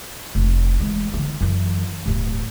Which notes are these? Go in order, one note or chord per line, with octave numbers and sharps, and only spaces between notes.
F1
E3 G#3
D3 E3
F#2 E3
D1 G2